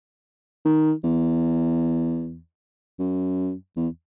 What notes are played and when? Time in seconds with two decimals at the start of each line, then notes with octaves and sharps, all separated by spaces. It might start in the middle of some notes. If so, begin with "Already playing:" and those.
0.65 D#3
1.04 E2
2.99 F#2
3.77 E2